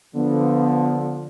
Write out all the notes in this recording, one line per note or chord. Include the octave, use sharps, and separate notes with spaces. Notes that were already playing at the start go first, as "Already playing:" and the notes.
D3 F3 B3